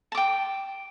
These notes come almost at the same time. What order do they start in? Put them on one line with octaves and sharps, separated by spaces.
A5 D6 G5